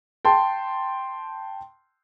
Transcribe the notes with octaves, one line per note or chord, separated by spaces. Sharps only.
G5 A5 C6